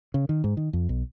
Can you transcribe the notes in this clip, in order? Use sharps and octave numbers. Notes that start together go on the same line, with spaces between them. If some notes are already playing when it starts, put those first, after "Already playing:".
C#3
D#3
G#2
D#3
F2
B1